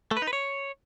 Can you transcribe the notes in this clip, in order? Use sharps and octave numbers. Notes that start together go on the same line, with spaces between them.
A3
B4
D#4
B4
C#5